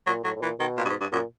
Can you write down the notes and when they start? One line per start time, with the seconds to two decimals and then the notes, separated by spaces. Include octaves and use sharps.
0.06 A#2 F#3
0.24 A2 F#3
0.36 A2
0.41 A#2 E3
0.59 B2 D#3
0.77 A#2
0.85 G2
0.89 G#2
1.01 G2
1.12 F#2 A#2